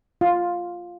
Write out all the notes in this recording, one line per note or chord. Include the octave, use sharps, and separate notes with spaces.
F4